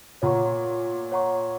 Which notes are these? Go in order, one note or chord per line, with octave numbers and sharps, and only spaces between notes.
A#2 C#5 F#5 A#5 C#6
C#5 F#5 A#5 C#6